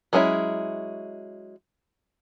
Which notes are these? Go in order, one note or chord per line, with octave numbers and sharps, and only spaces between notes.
F#3 G#3 C#4 D4 E4